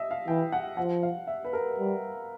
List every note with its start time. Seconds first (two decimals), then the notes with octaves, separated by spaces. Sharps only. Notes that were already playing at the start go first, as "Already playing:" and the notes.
Already playing: D#5 E5
0.11 F5
0.27 E3 G5
0.52 F#5
0.77 F3 F#5
1.03 F5
1.27 E5
1.44 B4
1.53 A#4
1.78 G3